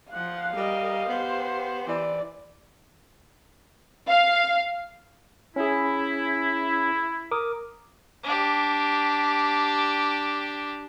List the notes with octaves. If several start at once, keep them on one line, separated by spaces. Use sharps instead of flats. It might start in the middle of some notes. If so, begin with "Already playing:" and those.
F3 F5 F#5
G3 A#4 D#5
B3 G4 C5
E3 D5
F5
C#4 E4 G#4
A#4 D6 D#6
D4 G4